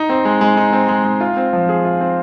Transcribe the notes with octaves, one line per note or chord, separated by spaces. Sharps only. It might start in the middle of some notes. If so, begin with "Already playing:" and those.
Already playing: D#4
C4
G#3
G#3
D#4
C4
G#3
G#3
F4
C4
F3
G#4
F4
C4